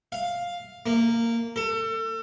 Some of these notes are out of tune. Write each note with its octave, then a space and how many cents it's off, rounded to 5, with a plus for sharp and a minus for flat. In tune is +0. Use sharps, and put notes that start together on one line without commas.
F5 +5
A#3 -15
A4 +35